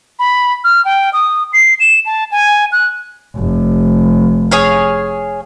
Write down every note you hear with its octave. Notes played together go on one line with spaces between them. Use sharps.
B5
F6
G5
D#6
C7
E7
A5
G#5
F#6
F1
G#4 C#5 F5